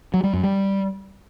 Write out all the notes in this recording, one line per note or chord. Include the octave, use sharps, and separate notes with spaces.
F#3
G3
F#2
G3